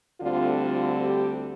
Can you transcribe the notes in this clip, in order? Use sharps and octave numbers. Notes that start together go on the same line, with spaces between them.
D2 D3 G3 C4 F4
F4
G4